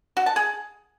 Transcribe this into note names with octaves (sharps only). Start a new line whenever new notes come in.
F#4
A5
G#4